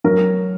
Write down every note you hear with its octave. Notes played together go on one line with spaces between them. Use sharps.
F#3 A#4